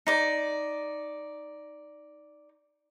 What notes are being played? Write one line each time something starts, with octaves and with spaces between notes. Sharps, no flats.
D#4 D5